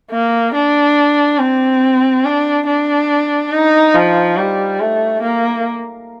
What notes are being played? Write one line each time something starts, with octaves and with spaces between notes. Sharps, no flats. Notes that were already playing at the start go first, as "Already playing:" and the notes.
A#3
D4
C4
D4
D4
D#4
F3
G3
A3
A#3